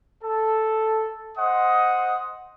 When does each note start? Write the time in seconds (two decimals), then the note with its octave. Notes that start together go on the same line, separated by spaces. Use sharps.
0.23 A4
1.37 C5 D#5 F#5 D#6